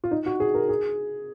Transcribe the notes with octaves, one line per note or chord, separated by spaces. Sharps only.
F4
D#4
F#4
G#4
A#4
G#4